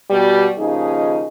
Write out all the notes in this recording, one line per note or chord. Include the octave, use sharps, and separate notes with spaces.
B2 G3
D#2 C#3 F3 D#4 G#4 D#5